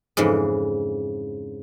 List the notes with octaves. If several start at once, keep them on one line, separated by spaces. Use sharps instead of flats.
F2 G#2 C#3 E3